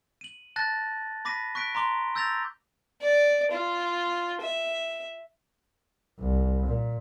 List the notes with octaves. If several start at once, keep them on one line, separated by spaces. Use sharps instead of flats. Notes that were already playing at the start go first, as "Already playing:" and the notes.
D#7 F#7
A5 F#6 A6 A#6
B5 D6 A#6 B6 D#7
C#6 F#6 B6 D7
A#5 C6 D6 G7
E6 G6 A6 A#6 F7
D5
F4
E5
C2
A#2